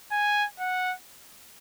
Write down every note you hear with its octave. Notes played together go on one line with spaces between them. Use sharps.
G#5
F#5